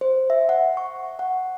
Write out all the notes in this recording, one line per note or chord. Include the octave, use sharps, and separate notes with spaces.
C5
E5
F#5
C#6
F#5